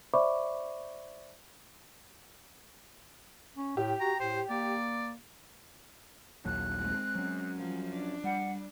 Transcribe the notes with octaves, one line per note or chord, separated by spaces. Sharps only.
C5 D5 E5 B5 C#6 D6
C#4
A2 G4
F#4 A#5
A2 C5
A#3 D5
A#1 D#2 F#3 F#6
G#3 C4
F#3 C#4
F3 G3
D4
G3 F#5